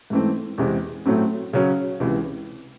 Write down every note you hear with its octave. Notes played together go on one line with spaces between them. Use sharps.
G#2 E3 A3 C4
E2 C3 E3 G#3 C4
A2 F#3 A3 C4
C#3 F#3 C#4
C#2 C3 E3